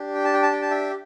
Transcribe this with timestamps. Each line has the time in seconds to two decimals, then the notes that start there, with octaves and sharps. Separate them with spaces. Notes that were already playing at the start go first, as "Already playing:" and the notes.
Already playing: D4 G4
0.15 G5
0.24 A5
0.34 G5
0.43 A5
0.52 G5
0.62 A5
0.71 E5 G5